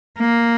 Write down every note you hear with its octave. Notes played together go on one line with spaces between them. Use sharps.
A#3